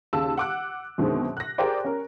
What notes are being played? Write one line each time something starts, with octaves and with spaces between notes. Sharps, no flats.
D#2 C#3 A5 E6
F#5 D6 F#6
F#2 B2 D3 D#3 G#3 C4
F#6 A#6
G4 G#4 A#4 C5 D5 G5
C#4 A#4